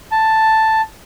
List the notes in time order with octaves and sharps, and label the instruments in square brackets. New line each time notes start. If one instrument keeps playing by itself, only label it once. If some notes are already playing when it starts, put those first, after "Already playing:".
[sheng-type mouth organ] A5